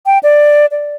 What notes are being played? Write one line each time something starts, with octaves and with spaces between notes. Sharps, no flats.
G5
D5
D5